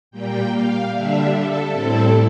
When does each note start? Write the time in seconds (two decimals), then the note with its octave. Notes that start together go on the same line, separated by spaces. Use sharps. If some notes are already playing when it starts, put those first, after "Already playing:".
0.11 A#2 G3 A#3 G5
0.50 F5
0.90 D3 G3 D4 E5
1.30 A4
1.70 A2 G3 C4 E4 A4